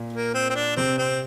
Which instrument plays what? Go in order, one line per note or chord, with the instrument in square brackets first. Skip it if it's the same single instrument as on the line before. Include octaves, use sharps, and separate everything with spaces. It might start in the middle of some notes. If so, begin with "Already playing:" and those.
Already playing: [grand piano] A#2
[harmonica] A#3
C4
C4
D4
[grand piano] C3 [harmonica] C4
[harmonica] C4